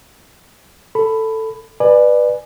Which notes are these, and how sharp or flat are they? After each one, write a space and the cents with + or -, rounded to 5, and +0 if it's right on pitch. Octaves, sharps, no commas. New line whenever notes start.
A4 +10 B5 +10
B4 +0 D5 +25 G#5 +0